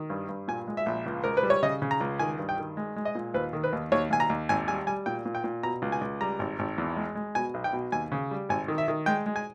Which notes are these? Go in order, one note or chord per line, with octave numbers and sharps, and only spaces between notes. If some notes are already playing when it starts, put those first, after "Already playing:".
Already playing: D#3
G2
G2
A#2 G#5
G#3
E5
A#1
C#2
C#2 A#4
B4
G3
C#5
C#3 D#5
C#3
A#5
C#2
D#3 G#5
G2
G5
D#3
G#3
G#3
D#5
A#2
D#2 B4
D#3
B4
D#2
D#2 C#5
D#2 G#5
A#5
D#2
G#1 G#5
G3 G#5
G3 G#5
A#2 G5
A#2
G5
A#2
B2 A#5
C#2
G#5
C#2
G3 A#5
G#1
G#1
E2
G#3
G#3
B2 G#5
B1
G5
B2
D#2 G#5
C#3
G3
G#1 G#5
D#3
E5
D#3
G#3 G5
G#3
G#5